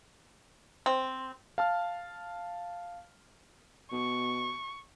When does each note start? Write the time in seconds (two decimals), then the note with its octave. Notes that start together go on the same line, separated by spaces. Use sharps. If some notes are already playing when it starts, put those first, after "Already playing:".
0.86 C4
1.58 F5 A5 F6
3.92 B2 C#6